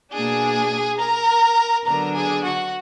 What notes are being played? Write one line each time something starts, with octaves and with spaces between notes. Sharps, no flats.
B2 A#3 D4 G#4 G#5
A#4 A#5
D3 F#3 B3 D4 A#4 A#5
G#4 G#5
F#4 F#5